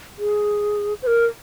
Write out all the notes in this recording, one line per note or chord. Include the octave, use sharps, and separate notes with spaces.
G#4
C5
A#4